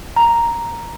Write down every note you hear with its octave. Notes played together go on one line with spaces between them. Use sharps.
A#5